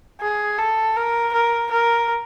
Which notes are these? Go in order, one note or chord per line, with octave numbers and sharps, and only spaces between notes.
G#4
A4
A#4
A#4
A#4